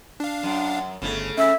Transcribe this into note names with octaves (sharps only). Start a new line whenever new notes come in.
D4 F5
F#2
G1 C#3 A3
C#4 E5